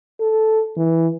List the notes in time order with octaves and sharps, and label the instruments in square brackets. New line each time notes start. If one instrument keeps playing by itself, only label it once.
[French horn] A4
E3